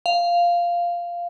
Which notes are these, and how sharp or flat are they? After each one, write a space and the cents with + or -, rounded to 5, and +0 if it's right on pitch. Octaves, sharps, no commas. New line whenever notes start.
F5 -5